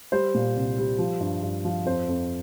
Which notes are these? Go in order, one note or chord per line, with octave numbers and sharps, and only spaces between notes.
G3 C5
A#2
C2
G3
F3
G2
G2
F3
F2 C5
F2